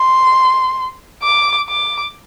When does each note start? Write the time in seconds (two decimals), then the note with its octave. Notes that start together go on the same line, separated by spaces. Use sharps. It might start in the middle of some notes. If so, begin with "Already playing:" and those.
Already playing: C6
1.22 D6
1.68 D6